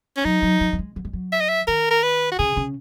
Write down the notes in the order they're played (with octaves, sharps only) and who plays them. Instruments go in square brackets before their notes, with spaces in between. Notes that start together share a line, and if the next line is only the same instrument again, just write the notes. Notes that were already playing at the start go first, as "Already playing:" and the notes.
[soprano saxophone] C#4
[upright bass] F#3 [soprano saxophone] D#4
[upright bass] F#3
F#3
F#3
G#3
F#3
G#3
F#3
[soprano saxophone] E5
D#5
E5
[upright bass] D#3 [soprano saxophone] A#4
[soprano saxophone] A#4
B4
F#4
[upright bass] C#3 [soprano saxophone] G#4
[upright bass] C#3